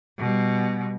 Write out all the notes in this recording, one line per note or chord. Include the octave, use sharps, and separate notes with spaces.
B2 G3